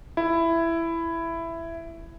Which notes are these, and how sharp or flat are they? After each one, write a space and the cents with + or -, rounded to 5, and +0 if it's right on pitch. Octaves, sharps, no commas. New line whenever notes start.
E4 +10